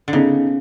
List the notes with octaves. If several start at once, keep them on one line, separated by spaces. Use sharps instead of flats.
D3
C#3 B3 D#4